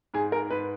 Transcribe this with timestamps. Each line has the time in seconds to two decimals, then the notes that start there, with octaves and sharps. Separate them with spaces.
0.14 G#2 G#4
0.32 A#4
0.50 G#2 B4